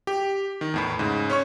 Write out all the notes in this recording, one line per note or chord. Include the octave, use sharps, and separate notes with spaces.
G4
D#3
E2 A2 B5
G#2 C#3
C#4 C#5 C#6